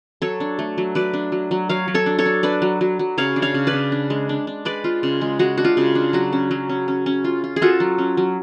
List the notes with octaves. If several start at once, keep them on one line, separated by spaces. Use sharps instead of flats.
F#3 A4 C#5
D4
A3
F#3
F#3 B4 D5
D4
F#3
F#3
F#3 C#5 F5
F#3
A4 C#5
D4
A4 C#5
D4
D4 B4 D5
F#3
F#3
F#3
C#3 C#5 F5
D4
C#5 F5
C#3
B4 D5
C#3
D4
G#3
D4
D4
G#3 B4 D5
F4
C#3
G#3
G#3 F#4
D4 F#4
F4
C#3
D4
F#3 F#4
C#4
F#3
C#4
C#4
C#4
F4
F4
G#4
F4 F#4 A4
F#3
C#4
F#3